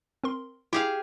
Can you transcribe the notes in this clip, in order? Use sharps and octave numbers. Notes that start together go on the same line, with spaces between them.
C4 A#4 C6
E4 G4 G#4 F5